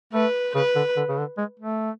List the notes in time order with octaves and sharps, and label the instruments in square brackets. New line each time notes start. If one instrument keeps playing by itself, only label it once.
[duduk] A3 [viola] B4
[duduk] C#3 [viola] B4
[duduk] D3
D3
C#3
D3
G#3
A3